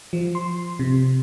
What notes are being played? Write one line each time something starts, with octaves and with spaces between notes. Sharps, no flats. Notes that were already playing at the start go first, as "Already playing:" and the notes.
F3
C6
C3